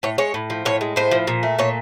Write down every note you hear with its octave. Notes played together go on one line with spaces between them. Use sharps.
A2 C#5
G#3 C#5
A2
F3
A2 C#5
G#3
A2 C5
F3
A#2
A3
A#2 C#5